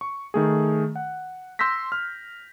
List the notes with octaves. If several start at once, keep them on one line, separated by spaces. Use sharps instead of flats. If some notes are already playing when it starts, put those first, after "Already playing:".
C#6
D#3 A3 G#4
F#5
C6 E6 G6 A#6 B6
F6